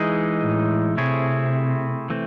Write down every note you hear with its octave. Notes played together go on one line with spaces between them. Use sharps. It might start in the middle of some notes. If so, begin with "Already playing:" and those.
Already playing: E3 G#3 D#4 G#4
A2
C3 A3 C4 E4 G#4 C#5
E3 A3 C4